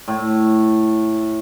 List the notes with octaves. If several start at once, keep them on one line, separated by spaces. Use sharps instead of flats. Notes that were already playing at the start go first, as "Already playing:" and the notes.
A2